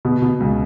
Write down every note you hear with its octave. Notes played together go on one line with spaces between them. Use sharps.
B2
B2
C#2